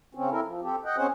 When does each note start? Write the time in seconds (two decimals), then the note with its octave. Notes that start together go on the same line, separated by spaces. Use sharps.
0.15 C#3 C4 C#4
0.31 C4 E4 A4 A#4
0.45 F3
0.62 C4 G4 A4
0.85 D#5 F#5 G5
0.97 C4 C#4 G#4 C5 F#5